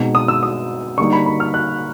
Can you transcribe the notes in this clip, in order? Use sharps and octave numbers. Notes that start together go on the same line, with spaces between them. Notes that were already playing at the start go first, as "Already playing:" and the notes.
Already playing: B2 G#3 C4 D#4
D#6
E6
D#6
D3 G3 A#3 D#4 C#6
B5
B5
F6
F#6